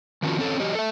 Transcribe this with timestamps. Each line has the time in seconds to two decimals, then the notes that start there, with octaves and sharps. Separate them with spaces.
0.22 D#3 F3 C#4 F4 F#4
0.38 C4 C#4 A4 C#5
0.60 F#3 G4 D#5
0.75 A4 E5